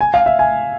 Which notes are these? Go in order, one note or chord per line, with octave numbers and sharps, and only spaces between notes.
G#5
F5
E5
G#5